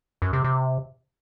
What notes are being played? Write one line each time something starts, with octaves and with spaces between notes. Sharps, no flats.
F#2
C3
C3